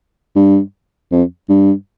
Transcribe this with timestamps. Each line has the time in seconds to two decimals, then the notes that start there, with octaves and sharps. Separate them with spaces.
0.36 G2
1.11 F2
1.49 G2